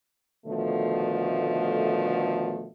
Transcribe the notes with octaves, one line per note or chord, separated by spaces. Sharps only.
B2 D3 D#3 F3 A3